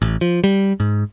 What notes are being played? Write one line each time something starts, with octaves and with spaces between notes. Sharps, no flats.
A1
F3
G3
G#2